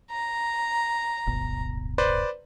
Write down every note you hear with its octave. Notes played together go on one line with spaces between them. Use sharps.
A#5
D1 G1 B2
B4 C5 D5